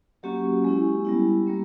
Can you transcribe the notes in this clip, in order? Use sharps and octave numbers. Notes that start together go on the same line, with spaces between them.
F#3 A#3 C#4 F#4 G4
G#3 C#4 E4
G3 B3 E4
G3 A#3 C#4